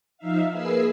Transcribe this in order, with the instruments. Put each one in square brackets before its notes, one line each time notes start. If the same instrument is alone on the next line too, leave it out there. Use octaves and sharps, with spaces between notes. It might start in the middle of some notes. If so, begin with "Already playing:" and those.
[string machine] F3 D#4 E5 F5
A#3 G#4 B4 G#5 E6 C7